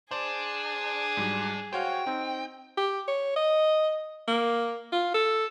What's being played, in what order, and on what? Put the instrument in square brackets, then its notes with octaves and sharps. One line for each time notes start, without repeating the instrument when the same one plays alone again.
[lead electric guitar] D4 [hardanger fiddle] G#4 [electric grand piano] C5 D5 A5
[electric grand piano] G#2 F#3 G3
[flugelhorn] F#4 [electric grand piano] C5 C#5 F5 [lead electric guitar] G5
[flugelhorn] C4 [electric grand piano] D#4
[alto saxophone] G4
C#5
D#5
A#3
F4
A4